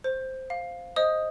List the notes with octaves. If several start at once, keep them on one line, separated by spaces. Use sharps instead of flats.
C5
F5
C5 D#5 D#6